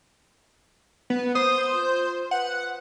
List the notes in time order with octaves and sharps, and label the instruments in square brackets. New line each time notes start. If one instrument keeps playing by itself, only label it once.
[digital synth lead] B3
[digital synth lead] C5 [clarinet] D#6
[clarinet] F4
[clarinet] B4 [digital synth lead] F#5